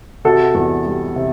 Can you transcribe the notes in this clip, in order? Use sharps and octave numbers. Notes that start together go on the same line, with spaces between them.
C3 F#4 A4
E2
G3
C3